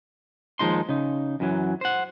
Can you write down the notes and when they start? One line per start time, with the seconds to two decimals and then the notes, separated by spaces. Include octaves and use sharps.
0.59 D#2 F3 G#3 D#4 C6
0.89 C#3 D#4
1.40 F#2 E3 F#3
1.81 C5 F#5